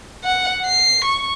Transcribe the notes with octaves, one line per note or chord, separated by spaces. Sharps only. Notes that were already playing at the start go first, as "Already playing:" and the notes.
F#5
C7
C#6